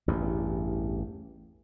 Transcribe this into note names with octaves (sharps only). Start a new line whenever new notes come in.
A1 E2 G2